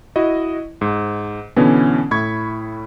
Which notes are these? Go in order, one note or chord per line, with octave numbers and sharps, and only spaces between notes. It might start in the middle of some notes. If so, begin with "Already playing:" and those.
E4 F#4 D#5
G#2
B2 D3 E3 B3 C#4
A2 E4 B5 C#6 G#6